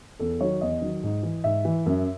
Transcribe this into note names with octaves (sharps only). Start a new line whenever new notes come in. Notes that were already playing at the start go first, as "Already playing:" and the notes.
E2 A4
D#3 F#3 C#5
E2 D#5
D#3 F#3
G#2
E3
G#2 E5
E3
F#2